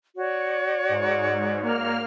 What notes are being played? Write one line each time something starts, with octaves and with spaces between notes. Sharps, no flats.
F#4 C#5 D5
G#2
A#3 F6